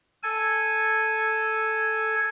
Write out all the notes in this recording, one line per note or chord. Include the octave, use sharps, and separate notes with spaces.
A4 G#5